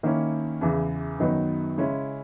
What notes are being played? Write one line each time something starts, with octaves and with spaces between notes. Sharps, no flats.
D#3 A#3 C#4 E4
E2 C#3 E3
F#2 D#3 F#3 B3 D#4
C#3 G#3 C#4 E4